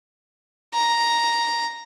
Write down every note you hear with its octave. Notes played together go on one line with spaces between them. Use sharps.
A#5